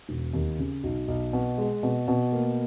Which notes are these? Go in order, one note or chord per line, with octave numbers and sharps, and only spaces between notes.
E1
D#2
C#3
B1
B1
B2
G#3
B2
B2
A#3